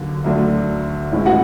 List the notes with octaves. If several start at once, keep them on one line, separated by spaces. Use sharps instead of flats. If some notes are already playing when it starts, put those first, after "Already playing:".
Already playing: D#2 D3 F#3
D2 D3 F#3 A3 D4
A2 E3 G#3 C#4 E4
F#4 F#5